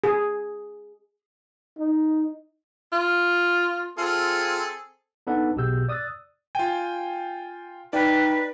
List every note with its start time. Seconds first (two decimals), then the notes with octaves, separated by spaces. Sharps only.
0.04 G#4
1.78 D#4
2.92 F4
3.98 C4 F4 G#4 A4
5.27 B3 D4 D#4 A4 B4 F#5
5.56 B1 B2 G4 G#4 E6 G6
5.88 D5 D#6 E6 F#6 A6
6.55 F4 G5 G#5
7.93 D#4 B4 D5 G5